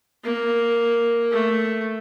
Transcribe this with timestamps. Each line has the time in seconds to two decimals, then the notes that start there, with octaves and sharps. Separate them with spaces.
0.24 A#3
1.31 A3